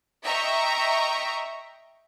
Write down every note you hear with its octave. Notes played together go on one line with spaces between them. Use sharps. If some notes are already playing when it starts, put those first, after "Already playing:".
D#5 E5 G5 A#5 C#6